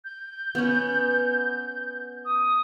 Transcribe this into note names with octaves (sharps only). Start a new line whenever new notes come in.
G6
B3 C#4
D#6